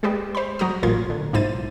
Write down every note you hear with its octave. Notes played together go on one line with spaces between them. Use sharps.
G#3 G4 G#4 B4 D5
C5 B5
F#3 F#4 A#5 D#6
A1 A#2 F4 A#4 C6 G#6
D3
B1 G#2 E4 C5 A6 D#7